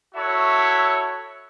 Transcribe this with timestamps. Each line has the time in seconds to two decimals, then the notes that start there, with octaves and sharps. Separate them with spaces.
0.15 E4 F#4 A4 C#5 E5